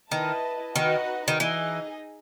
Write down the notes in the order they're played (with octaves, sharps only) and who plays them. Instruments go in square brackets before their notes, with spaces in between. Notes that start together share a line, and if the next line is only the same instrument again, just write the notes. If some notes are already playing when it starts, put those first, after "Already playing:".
[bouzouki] D#3 [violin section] E4 B4 D#5 A5
[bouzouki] D#3 [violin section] D#4 F#4 B4 D#5 F#5
[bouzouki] D#3
[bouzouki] E3 [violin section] D#4 G#4 D#5